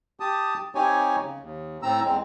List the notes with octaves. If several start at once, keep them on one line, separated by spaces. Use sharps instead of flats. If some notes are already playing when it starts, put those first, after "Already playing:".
G4 A5 D#6
C4 D#4 G4 C#5 G#5
C#3
D#2
A2 C4 A#5 E6
E2 G#3 C4